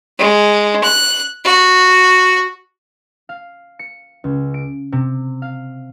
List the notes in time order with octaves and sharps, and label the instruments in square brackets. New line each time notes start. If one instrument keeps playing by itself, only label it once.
[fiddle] G#3
F#6
F#4
[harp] F5
C#7
C#2
D7
C3
F5